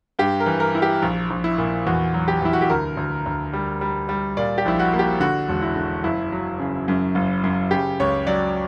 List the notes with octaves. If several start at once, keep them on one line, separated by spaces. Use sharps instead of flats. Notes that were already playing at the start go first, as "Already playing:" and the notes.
G2 G4
A#4
E3
A#4
E4
G4
A#1
A#1
E4
A#2
E2 F#4
F#3
G4
E2 E4
F#4
G4
D2 A#4
D2
D2
G3
G3
G3
A#2 D5
G4
A#1 E4
F#4
A#3
G4
D3 F#4
E1
E4
D3
F#1 E4
F#3
C#3
F#2
F#1
F#2
C#3 G4
C#2 C#5
F#3 D5